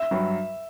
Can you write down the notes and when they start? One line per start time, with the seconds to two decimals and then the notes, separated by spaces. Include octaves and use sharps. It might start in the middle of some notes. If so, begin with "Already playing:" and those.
Already playing: E5
0.11 G2 F#3